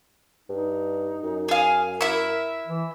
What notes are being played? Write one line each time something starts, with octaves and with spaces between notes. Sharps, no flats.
G2 D#4
F#2
G#4 F5
E4 A#4 E5
E3